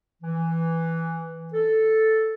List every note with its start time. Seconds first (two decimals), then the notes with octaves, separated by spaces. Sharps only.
0.23 E3
1.53 A4